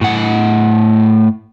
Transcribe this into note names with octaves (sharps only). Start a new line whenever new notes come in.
A2 F#5